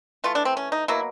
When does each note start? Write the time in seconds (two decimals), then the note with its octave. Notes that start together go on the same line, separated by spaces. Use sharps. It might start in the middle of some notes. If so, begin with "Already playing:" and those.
0.24 E3 A3 F4
0.35 D4
0.45 C4
0.57 C#4
0.72 D#4
0.88 B2 F#3 A#3 E4